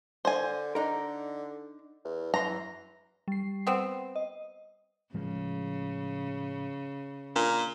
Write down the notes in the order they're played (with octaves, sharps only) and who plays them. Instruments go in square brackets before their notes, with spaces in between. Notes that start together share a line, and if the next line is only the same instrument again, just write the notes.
[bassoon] D3 [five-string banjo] C5 G#5
[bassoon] D3 [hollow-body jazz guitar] D4 D#4 A#4
[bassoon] E2
[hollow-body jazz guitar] F#2 C6 [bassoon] E3 [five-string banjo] A#5
[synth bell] G3 C7
[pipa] B3 C4
[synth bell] D#5
[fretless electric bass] A2 F3 G#3 [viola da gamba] C#3
[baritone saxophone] A#2 [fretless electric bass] D4